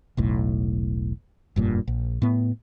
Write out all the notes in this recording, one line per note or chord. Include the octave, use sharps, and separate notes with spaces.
E1 B1 A2
F1 G2 A#2
A#1
A2 B3